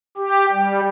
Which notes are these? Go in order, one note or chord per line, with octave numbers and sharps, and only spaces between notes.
G4
G3